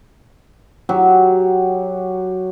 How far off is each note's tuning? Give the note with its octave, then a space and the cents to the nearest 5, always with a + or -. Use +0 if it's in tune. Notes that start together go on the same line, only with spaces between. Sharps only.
F#3 +5 G4 +10